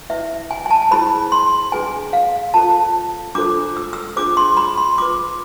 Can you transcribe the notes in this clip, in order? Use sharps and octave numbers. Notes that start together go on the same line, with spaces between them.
E4 B4 E5
G#5
G#5
A5
E4 G#4 C5 B5
C6
D4 G#4 B4 G#5
F5
F4 A4 C5 A5
D4 F4 A4 C5 D6
E6
E6
D4 F4 G#4 C5 D6
C6
B5
C6
F4 B4 D6